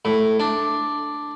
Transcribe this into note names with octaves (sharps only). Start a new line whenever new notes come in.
A2
D4